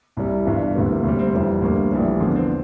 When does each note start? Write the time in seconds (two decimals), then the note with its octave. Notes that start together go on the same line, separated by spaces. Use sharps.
0.17 C2 C3 G3 E4
0.45 G1 G2 E3
0.75 D2 C3 E3 G3
0.90 A#3
1.04 D2 C3 G3 A#3
1.19 C4
1.34 F1 F2 E3 G3
1.62 D2 D3 G3 A#3
1.91 A#1 A2 E3 G3
2.20 E2 D3 F3 A#3
2.36 C4